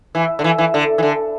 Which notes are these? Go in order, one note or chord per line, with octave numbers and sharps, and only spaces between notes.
E3
D3
E3
E3
D3
E3
D3